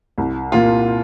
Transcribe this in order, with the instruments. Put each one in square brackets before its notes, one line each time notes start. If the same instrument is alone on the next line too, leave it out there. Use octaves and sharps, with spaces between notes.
[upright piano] C2
A#2 A#3 F4